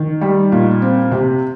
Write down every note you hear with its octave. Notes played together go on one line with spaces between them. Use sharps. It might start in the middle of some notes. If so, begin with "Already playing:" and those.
Already playing: D#3
G3
A#2
C4
C3